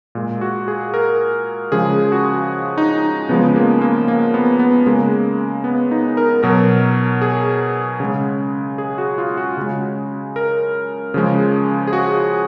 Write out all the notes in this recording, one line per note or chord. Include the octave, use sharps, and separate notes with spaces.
A#2 G#3
F#4
G#4
A#4
C#3 F3 G#3 G#4
F#4
D#4
C#3 F3 G#3 B3
A#3
A#3
A#3
B3
B3
C#3 G#3 A#3
B3
D#4
A#4
B2 F#3 A#4
G#4
C#3 G#3
G#4
F#4
F4
F#4
C#3 G#3
A#4
C#3 F3 G#3
G#4
F#4